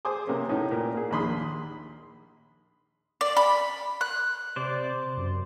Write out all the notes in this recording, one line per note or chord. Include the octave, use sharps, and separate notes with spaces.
G#4 C5 G#5 C6 D6 D#6
C3 A#3 B3 C#4
A2 C#4 D#4
A#2 A#4
A#3 G#4
A#1 D#2 B5 C6 D#6
D5
B5
F#6
C3 C5 D5
F#2